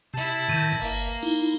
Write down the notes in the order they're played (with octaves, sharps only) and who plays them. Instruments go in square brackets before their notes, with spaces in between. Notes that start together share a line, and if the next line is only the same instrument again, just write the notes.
[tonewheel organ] C3 [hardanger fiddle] E4 A5
[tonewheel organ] A2 D#3
[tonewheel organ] G1 E5 [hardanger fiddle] A#3
[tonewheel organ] D#4 E4